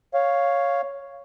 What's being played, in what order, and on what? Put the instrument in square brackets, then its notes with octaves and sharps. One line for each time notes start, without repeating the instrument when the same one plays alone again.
[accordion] C#5 F5